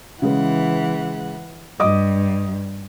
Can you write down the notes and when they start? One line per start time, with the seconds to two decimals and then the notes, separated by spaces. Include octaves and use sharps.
0.22 C#3 E3 G#3 B4 F#5
1.80 G2 D#5 D6 D#6